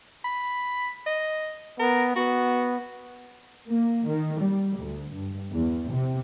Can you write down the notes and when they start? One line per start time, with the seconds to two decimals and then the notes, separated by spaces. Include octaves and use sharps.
0.25 B5
1.06 D#5
1.79 B3 A#4
2.16 B3 F#4
3.68 A#3
4.06 D#3
4.40 G3
4.78 D2
5.13 G2
5.51 E2
5.91 C3